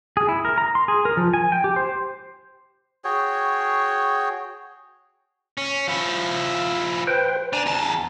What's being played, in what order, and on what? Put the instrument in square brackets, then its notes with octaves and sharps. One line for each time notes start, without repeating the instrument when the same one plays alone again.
[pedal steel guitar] G#4
E4
A#4
A#5
C6
G#4
A#4
F3
G#5
G5
G4
C5
[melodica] F#4 G#4 C#5 G5
[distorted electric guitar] C#4
F3 E4
[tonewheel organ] B4 C5 G5
[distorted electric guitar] D4 [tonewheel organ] G#5 A#5
[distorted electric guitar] E2 A5